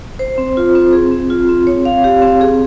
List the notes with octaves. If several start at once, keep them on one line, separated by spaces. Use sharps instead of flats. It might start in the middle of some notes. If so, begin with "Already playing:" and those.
C5
C4
F4
C4
G#4
C4
F4
C4
C#5
F5
G4
C4
G#4